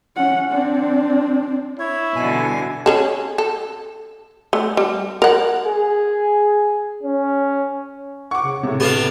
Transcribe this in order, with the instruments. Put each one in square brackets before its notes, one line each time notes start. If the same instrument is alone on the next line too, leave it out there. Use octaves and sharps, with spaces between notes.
[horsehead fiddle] C#4 F#5
C4 D4
[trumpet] E4 [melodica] C#5
[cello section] B2 D3 G3 [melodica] G#5
[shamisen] C#4 G#4 A4
A4
A3
G3
A#4 F#5
[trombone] G#4
C#4
[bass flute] F#5 [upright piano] C#6 D6
[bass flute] C#3
[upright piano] A2 C3
[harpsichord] B3 D4 F5 [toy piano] G4 A4